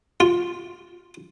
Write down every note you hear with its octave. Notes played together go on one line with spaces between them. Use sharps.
F4